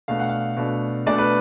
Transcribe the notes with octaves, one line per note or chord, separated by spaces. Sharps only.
B2 A3 D4 F5
F#5
F5
B2 A3 D4
B2 A3 D4 D5
B4